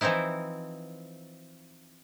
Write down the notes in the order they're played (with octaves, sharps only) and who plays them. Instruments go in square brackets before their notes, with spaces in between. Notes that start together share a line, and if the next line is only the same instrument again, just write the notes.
[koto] E3 F3 C4 D#4 E4